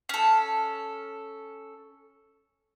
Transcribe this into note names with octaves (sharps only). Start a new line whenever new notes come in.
C#4 A4